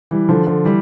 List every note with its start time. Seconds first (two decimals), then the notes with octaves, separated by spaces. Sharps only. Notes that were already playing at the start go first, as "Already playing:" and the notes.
0.11 E3 G3
0.29 D3 F3
0.47 D3 F3
0.65 E3 G3